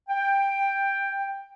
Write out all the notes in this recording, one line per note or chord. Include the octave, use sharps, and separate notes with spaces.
G5